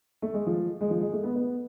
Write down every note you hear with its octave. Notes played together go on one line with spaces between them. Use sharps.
A3
G#3
F3
G#3
F3
G#3
A3
B3
B3